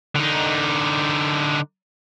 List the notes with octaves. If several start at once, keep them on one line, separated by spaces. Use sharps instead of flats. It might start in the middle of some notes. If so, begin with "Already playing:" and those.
D3 D#4